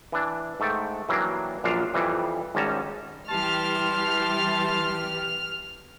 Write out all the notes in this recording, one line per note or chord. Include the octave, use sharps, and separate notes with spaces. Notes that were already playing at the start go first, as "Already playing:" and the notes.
E3 D4
G#2 A3 A4 G5
E3 F#3 G3 A#3 D4
A#1 F#2 A#2 D4 F5
F2 E3 G3
G#1 G#2 G3 C#4 A5 A#5
E3 G3 G4 A5 C6 F6